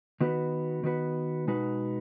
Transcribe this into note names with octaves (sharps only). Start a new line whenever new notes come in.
D#3 B3 F#4 B4
D#3 B3 F#4 B4
B2 G#3 D#4 F#4 B4